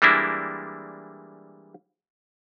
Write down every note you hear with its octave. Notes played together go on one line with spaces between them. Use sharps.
E3 G3 G#3 A#3 D4 E4